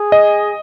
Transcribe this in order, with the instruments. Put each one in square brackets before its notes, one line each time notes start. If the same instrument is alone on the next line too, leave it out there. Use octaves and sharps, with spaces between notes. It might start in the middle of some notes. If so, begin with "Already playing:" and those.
Already playing: [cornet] G#4
[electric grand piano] D#5